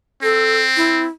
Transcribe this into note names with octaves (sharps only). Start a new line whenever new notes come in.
C4 A4
E4